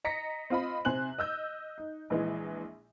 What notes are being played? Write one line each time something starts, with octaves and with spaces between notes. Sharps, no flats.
D#5 A#5 A#6 B6 C#7
C4 F4 D#5 B5
C3 C5 G#5 F#6 F#7
D#5 E6 G6
D#4
A#1 E3 G#3